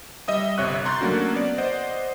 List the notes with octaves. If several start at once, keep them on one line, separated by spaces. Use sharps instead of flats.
G3 D#5 E5 D#6
G1 C3 C#5 E5 C#6 F#6
A#5 C6 C#6 F#6 G6 A6
F#3 A3 A#3 C#4 D4 F#4
B3 D5
C5 D5 D#5 F#5